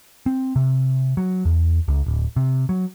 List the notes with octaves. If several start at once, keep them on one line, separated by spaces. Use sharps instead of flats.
C4
C3
F#3
E2
C#2
D1
C3
F#3